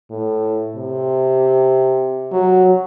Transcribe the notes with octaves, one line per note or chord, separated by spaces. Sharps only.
A2
C3
F#3